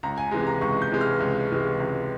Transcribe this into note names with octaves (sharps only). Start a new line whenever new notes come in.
C#2 A#5
G#5
C3 E3 G#3
A#5
C#2 C#6
G6
C3 E3 G#3
F6
C#2
C3 E3 G#3
C#2